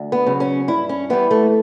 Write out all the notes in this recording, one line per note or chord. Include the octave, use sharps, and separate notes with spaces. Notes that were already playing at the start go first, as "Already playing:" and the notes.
Already playing: D2
B3
C#3 F#3
C#4
G2 E4
C#4
E3 G3 B3
A3